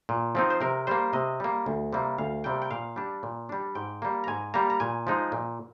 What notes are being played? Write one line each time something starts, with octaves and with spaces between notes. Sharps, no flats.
A#2
F3 C4 D#4
C5
C3 A#4
G3 A#3 C5
C3 D#5
G3 A#3
D2
C3 G3 A#3
D2 F5
C3 G3 A#3 G5
G5
A#2 F5
G3 D4
A#2
G3 D4
G#2 G5
G3 A#3
A#5
G#2 G#5
G3 A#3 A#5
A#5
A#2 G#5
F3 G#3 D#4
A#2